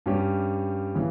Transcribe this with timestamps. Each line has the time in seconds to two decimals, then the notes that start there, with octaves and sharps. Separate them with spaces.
0.06 G2 G3 C#4 G4
0.95 C#3 E3